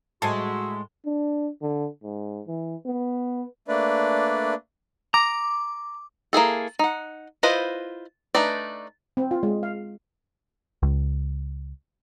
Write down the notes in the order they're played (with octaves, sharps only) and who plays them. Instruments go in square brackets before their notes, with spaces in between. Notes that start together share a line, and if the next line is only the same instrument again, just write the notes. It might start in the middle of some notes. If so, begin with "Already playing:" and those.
[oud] A2 G#3 [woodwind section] F#4 E5 [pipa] A4 C5 G#5 [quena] C6
[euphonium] D4
D3
G#2
E3
B3
[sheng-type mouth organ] A3 A#3 D4 B4 D5
[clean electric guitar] A#5 [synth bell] D6
[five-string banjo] A#3 E4 G#4 A4
D#4 F#5
E4 F4 B4 C5 D#5
A3 D4 D#4 B4 D5
[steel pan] C4
F4
G#3
F5
[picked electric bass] C#2